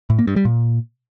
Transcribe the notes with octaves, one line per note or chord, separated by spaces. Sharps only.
A2
A#3
G2
G3
A#2